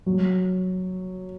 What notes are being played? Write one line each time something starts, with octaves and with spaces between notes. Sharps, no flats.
F#3